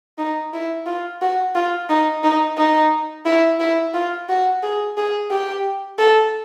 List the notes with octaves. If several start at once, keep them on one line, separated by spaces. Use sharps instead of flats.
D#4
E4
F4
F#4
F4
D#4
D#4
D#4
E4
E4
F4
F#4
G#4
G#4
G4
A4